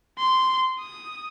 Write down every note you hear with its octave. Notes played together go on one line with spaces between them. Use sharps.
C6
D#6